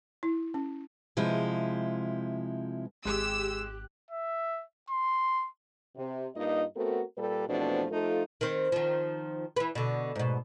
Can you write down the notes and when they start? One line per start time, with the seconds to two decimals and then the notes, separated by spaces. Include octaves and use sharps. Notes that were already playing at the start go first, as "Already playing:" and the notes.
0.23 E4
0.54 C#4
1.17 C3 F3 G#3 E4
3.05 G#1 G#3 G4 E6 F#6
4.11 E5
4.90 C6
5.96 C3
6.35 G2 A#3 D#4 F4 D#5
6.75 A3 B3 C4 F#4 A4 A#4
7.17 A#2 G3 G4 A4 B4
7.49 E2 B2 F3 A3 C4 D4
7.91 F3 A3 D#4 F4 A4
8.41 D#3 C4
8.72 D#3 F3
9.56 E3 B4
9.75 B2 D3
10.16 G#2 B2